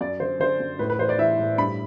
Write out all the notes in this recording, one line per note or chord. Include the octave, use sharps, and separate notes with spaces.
F#2 D5
D3 C5
D3 C5
F#2
A2 B4
B4
E3 C5
D5
E3 E5
A2
G2 B5